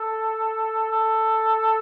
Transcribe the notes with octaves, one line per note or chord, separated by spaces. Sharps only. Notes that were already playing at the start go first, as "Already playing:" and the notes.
Already playing: A4
A4